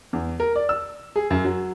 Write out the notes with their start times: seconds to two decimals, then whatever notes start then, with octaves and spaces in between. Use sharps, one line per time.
0.13 E2
0.40 A#4
0.56 D5
0.69 E6
1.16 G#4
1.30 F#2
1.45 F#3